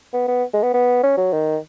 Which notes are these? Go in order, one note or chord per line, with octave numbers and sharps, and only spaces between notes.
B3
B3
G#3
B3
B3
C#4
F#3
D#3